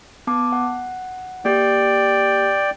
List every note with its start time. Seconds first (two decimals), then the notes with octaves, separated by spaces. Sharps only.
0.27 B3 A5 D6
0.52 F#5
1.45 A#3 G4 D5 G5 G6